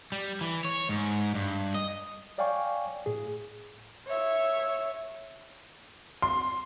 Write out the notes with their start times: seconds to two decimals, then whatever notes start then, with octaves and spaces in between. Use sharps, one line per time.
0.12 G3
0.41 E3
0.65 C#5
0.89 G#2
1.34 G2
1.75 D#5
2.38 C#5 D5 F5 G5 G#5 C#6
3.06 A2 G#4
4.07 C#5 E5
6.22 C6